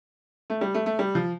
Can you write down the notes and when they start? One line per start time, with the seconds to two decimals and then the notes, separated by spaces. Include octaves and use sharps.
0.50 A3
0.61 G3
0.74 A3
0.86 A3
0.99 G3
1.15 F3